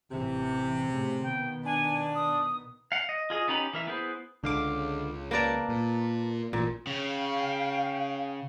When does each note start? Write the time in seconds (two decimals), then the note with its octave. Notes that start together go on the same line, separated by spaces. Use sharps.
0.10 A1 C3 E3
0.88 A2 C#3 A3
1.23 B2 D#3 B3 G5
1.65 D4 G#5
2.15 D#6
2.92 F5 F#5
3.09 D#5
3.30 F4 G#4 D#5
3.48 B3 C#4 D#4 G4 B5
3.73 E3 A#4 E5
3.87 B3 E4 G#4 B4 C5
4.44 C#2 D3 F5 D6
5.31 A#3 A#4 B4 D5 A5
5.69 A#2
6.53 A1 A#2
6.87 C#3 F5 G5